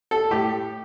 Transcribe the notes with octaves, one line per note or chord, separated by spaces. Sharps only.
A4
A2 G4